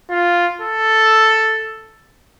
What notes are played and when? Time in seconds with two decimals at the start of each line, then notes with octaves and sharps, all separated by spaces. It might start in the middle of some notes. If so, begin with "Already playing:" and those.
0.10 F4
0.61 A4